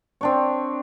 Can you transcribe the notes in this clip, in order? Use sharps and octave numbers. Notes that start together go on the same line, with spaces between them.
C4 D4 C#5